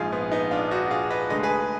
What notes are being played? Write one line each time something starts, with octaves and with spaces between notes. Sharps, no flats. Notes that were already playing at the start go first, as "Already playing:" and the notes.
Already playing: A#1 G#2 F3 G#3 F4 G#4
B3
B3 D#4
D4 F4
D#4 F#4
F4 G#4
B4 D#5
D2 D3 G#3 B4 D#5
G#4 B4